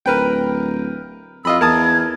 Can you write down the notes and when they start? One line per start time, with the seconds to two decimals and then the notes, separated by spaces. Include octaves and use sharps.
0.06 D1 A#4 B4 G5
1.45 F2 F4 D#5 B5 E6
1.61 E2 A#4 A5 D#6 G#6